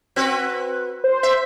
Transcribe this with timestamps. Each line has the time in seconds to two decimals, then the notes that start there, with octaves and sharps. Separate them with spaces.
0.16 C4 F#4 B4
1.04 C5
1.23 E5